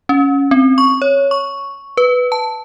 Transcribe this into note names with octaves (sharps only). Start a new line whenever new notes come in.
C#4
C4
C#6
C#5
C#6
B4
A5